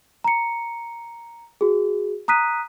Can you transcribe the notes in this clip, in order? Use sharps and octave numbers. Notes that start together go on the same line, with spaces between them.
A#5 C#7
F#4 G#4
A#5 D#6 F#6 B6 D#7